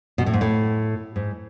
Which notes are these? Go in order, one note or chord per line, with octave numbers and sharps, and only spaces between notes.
B2
A2
G#2
A2
G#2